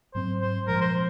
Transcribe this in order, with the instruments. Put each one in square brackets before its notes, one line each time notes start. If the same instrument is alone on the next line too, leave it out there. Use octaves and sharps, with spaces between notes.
[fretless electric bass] G#2 F#3 C4 [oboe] C5
[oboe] C5
[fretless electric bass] A#2 F3 G#3 [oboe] A#4
[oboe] C5